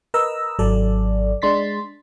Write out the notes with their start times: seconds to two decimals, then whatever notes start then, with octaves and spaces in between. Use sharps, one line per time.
0.14 A#4 B4 D#5 A#5 E6
0.59 G#1 F#3 A4 D5
1.42 G#3 D4 C6 A6 B6